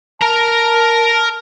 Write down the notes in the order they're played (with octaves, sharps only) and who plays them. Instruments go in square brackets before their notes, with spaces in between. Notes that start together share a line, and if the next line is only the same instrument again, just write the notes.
[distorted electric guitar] A#4 A#5 [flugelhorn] A5